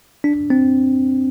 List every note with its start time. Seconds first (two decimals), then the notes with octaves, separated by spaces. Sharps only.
0.24 D4
0.50 C4